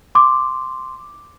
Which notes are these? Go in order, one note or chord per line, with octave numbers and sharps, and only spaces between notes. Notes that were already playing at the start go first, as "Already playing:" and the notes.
C6 D6